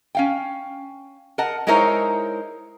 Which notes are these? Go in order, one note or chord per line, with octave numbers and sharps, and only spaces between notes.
C#4 F5 G5
A#4 D#5 F#5 A5
G#3 D#4 E4 A#4 C5 C#5